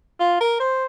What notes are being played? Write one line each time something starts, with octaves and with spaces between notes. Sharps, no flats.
F4
A#4
C5